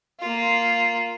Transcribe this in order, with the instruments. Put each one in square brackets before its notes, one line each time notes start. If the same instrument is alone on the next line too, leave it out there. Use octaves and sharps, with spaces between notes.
[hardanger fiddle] A#3 F4